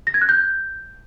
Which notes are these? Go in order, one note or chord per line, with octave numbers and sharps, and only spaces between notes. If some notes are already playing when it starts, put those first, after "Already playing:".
A#6
G#6
F#6
G6